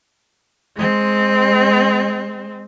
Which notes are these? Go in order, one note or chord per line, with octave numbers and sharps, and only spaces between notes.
G#3 C4